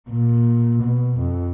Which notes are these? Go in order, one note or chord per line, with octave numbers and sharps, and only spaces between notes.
A#2
B2
F2